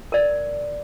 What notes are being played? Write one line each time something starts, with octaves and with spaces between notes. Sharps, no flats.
A#4 D5